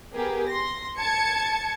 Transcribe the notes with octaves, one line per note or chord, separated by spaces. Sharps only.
B3 G4 G#4 A#4
C6 A#6
A5 G#6 C#7